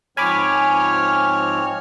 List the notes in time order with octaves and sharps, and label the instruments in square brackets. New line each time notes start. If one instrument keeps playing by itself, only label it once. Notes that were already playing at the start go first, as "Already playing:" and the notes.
[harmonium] G#2 F3 C4 [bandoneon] C#5 F6 [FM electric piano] G#5 B5 D6